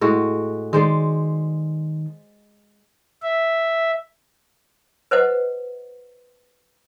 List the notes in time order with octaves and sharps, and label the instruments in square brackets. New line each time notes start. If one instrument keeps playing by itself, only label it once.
[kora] A2 G#3 F#4
[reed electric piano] D#3 [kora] G#3 C5 D5
[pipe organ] E5
[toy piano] B4 C5 D#5 F#5